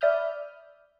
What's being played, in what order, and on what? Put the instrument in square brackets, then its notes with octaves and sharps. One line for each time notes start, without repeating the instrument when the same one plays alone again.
[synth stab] D5 E5 B5 D#6 F6 G6